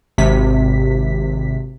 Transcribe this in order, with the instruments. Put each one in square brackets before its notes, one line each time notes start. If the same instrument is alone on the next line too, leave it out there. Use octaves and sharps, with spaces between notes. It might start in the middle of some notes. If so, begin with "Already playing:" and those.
[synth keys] G#1 C3 B6